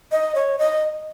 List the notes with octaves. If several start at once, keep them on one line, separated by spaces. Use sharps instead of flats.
D#5
C#5
D#5